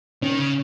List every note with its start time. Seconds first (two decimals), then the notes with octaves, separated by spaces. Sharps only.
0.22 D#3 C#4
0.38 C#3